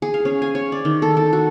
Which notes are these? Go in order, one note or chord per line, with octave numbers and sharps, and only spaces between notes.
G#4
F5
C#4
G#5
C#5
D5
D#3
A4
A4
F#4